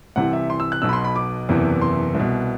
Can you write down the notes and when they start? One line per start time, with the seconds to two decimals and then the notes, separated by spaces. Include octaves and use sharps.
0.16 C2 C3 E3 F#5
0.33 E5
0.50 C6
0.60 E6
0.72 F#6
0.82 B1 B2 E6
0.89 B5
0.93 C6
1.04 B5
1.16 D6
1.49 F#1 E2 C3 E3
1.81 C6
2.15 C2 B2